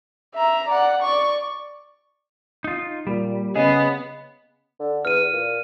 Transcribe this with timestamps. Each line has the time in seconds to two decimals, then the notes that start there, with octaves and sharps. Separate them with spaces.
0.34 E5 A#5
0.68 D5 F#5
1.02 D5 C#6
2.64 D#4 F4
3.07 A#2 G3
3.56 C#3 B3 G#4 D#5
4.79 D3
5.05 E2 F6 D#7
5.33 A#2